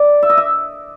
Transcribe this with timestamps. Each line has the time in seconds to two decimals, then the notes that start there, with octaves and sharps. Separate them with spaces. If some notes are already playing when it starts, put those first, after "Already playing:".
Already playing: D5
0.23 E5
0.30 D#5
0.38 E5